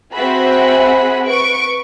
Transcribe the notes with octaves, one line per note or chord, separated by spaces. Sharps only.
C4 F#4 G#4 E5 F#5 B5
B4 C#6 D7